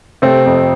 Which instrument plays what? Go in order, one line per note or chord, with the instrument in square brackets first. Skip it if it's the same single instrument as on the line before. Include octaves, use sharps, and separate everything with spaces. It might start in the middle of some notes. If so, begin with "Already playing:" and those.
[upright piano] C3 [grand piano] A3 C4
[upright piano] F2